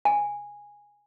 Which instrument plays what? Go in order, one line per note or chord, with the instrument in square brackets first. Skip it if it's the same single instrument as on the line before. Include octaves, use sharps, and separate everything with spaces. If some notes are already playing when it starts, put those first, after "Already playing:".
[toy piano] G#5